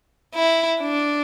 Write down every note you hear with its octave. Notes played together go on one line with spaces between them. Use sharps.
E4
D4